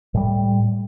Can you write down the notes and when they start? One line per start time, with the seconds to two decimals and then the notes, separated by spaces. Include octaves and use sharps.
0.14 A2 G3